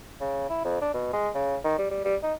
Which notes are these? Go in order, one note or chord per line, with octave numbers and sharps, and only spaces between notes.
C#3
E4
F2
D4
B2
G#3
C#3
D#3
G3
G3
G3
D#4